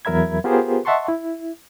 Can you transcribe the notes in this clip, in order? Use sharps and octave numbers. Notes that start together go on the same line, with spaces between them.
E2 F#3 A#4 E5 B5 G#6
B3 F4 G4 G#4 A#4 C5
D#5 E5 F#5 A5 C6 C#6
E4